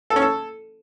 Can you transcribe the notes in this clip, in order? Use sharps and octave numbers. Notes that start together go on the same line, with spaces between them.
A4
C#4
A4